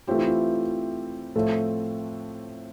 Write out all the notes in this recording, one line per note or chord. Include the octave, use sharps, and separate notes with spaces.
E3 A3 C4 F4 G4
E4
F4
A2 F3 A3 C4 A4